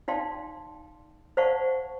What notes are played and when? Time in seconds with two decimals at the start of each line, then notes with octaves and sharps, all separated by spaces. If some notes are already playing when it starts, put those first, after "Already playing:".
0.08 D#4 D5 F5 G5 A5 C6
1.37 C5 D5 F5 F#5 A5 C#6